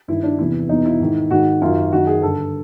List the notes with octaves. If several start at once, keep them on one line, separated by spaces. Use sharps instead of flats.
G2 D#3 E4
D4
E2 C3 E3 E4
E2 B2 D#4
E4
G#2 D#3
G#2 D#3 F#4
F#2 D#3 F4
F#2 D#3 F#4
G#4
G2 D3 A4